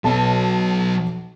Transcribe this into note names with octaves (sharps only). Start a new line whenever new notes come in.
B1 F#3 B4 A5